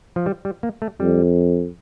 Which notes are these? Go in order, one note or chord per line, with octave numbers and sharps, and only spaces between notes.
F3
G3
G3
A#3
A3
F2 G3